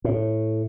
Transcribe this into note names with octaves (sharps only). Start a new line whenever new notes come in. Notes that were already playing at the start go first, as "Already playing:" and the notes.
A2